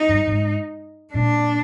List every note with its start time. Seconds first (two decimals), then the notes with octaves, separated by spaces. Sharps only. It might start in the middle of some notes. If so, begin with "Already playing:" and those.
Already playing: D#4
0.08 G2
0.27 G#2
1.14 A#2 D4